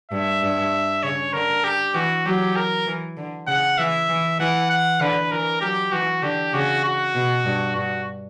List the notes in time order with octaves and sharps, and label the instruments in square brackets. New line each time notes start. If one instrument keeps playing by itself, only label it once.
[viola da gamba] G2 [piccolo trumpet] E5
[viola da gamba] G2
[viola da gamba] C#3 [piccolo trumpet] C#5
[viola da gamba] D3 [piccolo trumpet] A#4
[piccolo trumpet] G4
[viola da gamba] E3 [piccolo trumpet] F#4
[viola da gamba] F#3 [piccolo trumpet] G4
[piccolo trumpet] A#4
[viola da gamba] E3
D3
[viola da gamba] C#3 [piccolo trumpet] F#5
[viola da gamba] E3 [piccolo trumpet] E5
[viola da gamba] E3
[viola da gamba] E3 [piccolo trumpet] F#5
[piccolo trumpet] F#5
[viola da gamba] D3 [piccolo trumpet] B4
[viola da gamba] E3 [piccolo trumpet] A#4
[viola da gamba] F#3 [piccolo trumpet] G4
[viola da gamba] E3 [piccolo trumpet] F#4
[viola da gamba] D3 [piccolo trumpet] G4
[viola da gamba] C#3 [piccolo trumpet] F#4
[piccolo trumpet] F#4
[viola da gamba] B2
G2
[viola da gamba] G2 [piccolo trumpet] F#4